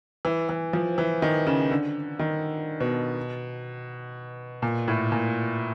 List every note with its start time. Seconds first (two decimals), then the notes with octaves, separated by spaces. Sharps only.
0.25 E3
0.49 E3
0.73 F3
0.98 E3
1.22 D#3
1.47 C#3
1.71 D3
2.19 D#3
2.80 B2
4.62 A#2
4.88 A2
5.12 A#2